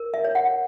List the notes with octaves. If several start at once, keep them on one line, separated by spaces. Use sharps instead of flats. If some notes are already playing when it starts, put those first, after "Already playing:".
Already playing: A#4
E5
C#5
F#5